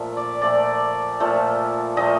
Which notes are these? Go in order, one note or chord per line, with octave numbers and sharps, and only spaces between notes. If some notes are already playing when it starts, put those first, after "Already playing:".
Already playing: A#2 F3 A3
D5
A#2 F3 A3 D5
A#2 F3 A3
A#2 F3 A3 D#5